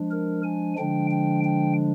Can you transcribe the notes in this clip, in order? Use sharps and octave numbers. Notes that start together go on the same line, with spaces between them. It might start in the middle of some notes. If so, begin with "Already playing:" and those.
Already playing: F3 G#3 D4
A#4
G#5
D3 F3 G#3 D4 G5
G5
G5